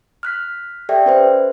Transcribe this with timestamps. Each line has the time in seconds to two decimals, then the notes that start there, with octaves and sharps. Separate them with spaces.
0.23 F6 F#6 B6
0.89 G4 A4 D5 E5 G5
1.06 C#4 B4 C5